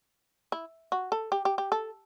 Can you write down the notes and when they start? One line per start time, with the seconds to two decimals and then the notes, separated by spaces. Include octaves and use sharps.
0.52 E4
0.92 F#4
1.12 A4
1.32 G4
1.45 G4
1.58 G4
1.72 A4